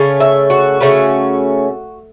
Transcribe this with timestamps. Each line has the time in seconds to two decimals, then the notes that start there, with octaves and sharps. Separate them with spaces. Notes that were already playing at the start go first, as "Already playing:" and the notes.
Already playing: C#3 A3 C#4
0.20 E5
0.50 F#4
0.81 C#3 A3 C#4